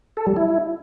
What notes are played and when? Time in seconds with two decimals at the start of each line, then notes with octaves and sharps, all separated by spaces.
0.17 A4
0.27 G3
0.36 E4